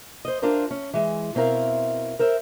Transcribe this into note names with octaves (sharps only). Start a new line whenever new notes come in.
C5 D#5
D4 F4 A#4 C5
C#4
E3 G#3
B2 C4 E4 A#4 F5
A#4 C5 E5